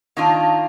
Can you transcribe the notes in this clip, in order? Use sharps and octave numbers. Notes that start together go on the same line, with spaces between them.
D#3 A#3 D4 F4